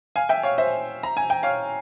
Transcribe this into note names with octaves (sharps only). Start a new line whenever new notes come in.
F5 G#5
E5 G5
C#5 F5
C5 E5
A#5
G#5
G5
C#5 F5